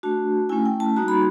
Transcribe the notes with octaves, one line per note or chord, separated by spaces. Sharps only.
A3 D4 F#4 A5
A3 C#4 E4 G#5
G5
A5
G3 A#3 D#4 F#4 A#5
B5